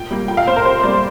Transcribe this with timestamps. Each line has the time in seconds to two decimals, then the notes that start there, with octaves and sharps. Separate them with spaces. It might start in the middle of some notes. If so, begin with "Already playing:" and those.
Already playing: A#2 G5
0.11 G3 A#3
0.28 A#2 G5
0.37 F5
0.47 A#3 C5
0.56 A#4
0.65 C3 C5
0.83 G3 A#3 D5